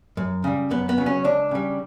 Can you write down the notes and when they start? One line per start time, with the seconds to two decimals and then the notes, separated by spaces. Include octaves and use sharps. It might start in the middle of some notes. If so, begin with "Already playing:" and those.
0.17 F#2
0.44 C#3 G3
0.71 F#2 B3
0.89 B3
0.98 C#3 F#3
1.06 C#4
1.24 C#2 D4
1.51 C#3 G3